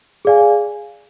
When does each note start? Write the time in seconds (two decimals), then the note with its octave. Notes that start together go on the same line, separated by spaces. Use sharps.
0.25 G#4 D5 F5 G#5